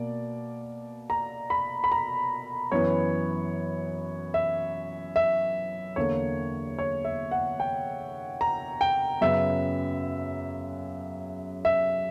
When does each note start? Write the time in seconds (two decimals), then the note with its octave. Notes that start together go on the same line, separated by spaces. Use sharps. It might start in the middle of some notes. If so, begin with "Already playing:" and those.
Already playing: B2 A#3 D5
1.10 A#5
1.50 B5
1.84 B5
1.92 A#5
2.72 F#2 E3 B3 C#5
4.34 E5
5.16 E5
5.96 E2 D3 A#3 C#5
6.79 C#5
7.05 E5
7.31 F#5
7.60 G5
8.41 A#5
8.81 G5
9.21 F#2 C#3 F#3 B3 E5
11.65 E5